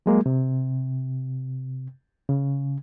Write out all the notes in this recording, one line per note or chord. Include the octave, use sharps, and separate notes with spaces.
F#3 G#3 A#3
C3
C#3